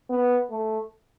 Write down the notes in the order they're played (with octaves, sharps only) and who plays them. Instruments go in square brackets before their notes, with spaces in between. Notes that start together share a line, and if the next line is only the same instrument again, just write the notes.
[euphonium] B3
A3